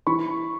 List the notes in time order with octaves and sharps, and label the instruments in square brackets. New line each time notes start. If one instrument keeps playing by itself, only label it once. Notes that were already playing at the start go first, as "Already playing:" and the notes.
[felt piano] E3 B5 C#6